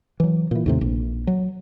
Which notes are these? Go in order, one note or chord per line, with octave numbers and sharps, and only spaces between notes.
E3 F#3
A#2 E3
D#2 A2 C3
A#1
F#3